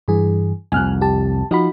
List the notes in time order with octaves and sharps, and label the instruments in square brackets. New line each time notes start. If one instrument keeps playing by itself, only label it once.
[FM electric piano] G2 E3 G#4
[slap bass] C2 F2 [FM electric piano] G#5 F6 F#6
[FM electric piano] G4 A5
[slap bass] F3 [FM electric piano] D#4 F#4 B5